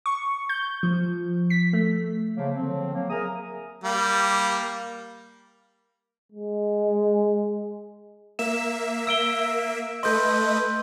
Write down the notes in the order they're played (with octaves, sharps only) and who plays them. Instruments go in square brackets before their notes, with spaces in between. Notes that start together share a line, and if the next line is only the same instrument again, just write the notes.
[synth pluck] C#6
G6
F3
B6
A3
[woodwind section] C#3 F3 F#3 A3 A#3
D3 F3 F#3 C4
F#3 A#3
G#4 A#4 E5 G#5 A#5 D#6
[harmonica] G3 A#3
[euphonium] G#3
[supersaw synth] A#3 E5 [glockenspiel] E7
[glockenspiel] E6 D7 G7
[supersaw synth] A3 B4 D#5 [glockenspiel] C6 G6